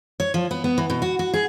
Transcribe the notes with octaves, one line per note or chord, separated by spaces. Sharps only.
C#5
F3
B3
B3
E3
B2
F#4
F#4
G#4